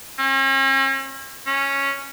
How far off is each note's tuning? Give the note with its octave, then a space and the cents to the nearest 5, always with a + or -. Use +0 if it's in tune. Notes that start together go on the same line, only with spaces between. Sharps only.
C#4 -45
C#4 -5